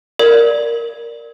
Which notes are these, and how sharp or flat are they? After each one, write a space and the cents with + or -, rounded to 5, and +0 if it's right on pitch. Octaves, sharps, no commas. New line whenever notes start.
A#4 +0 D5 +0